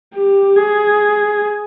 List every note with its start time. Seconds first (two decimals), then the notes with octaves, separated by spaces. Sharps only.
0.15 G4
0.56 G#4